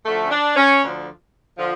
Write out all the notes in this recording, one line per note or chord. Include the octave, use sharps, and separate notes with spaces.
D2 D3 F3 A3
C#4
D4
C#4
D2 D3 F3
D3 F3